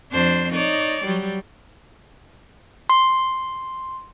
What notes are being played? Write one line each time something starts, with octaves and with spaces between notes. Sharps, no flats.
F2 D4 C5
D#4 C#5 D5
F#3 G3
C6